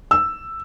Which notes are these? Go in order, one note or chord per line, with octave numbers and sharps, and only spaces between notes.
E6